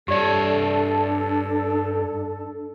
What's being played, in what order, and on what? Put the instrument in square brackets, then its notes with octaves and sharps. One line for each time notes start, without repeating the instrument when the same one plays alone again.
[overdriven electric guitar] G2 C#5 [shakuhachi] D4 [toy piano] G4 D5 [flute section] A4